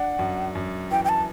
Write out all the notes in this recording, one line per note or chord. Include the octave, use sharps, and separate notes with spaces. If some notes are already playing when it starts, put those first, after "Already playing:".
Already playing: D4 F#5
F#2
F#2
E3 G5
G5
A5